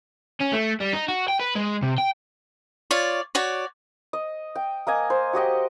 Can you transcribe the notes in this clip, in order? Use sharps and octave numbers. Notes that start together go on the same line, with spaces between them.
C#4
A3
G3
D#4
F#4
G5
B4
G#3
C3
G5
F4 C#5 D5
F#4 C#5 D5
D#5
G5
A#3 D#5 G#5
C5
F#4 G4 D#5 G5